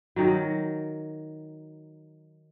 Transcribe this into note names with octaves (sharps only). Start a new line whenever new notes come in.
D#3 F#3